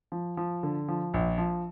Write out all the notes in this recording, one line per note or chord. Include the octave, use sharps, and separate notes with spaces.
F3
F3
D3
F3
A#1
F3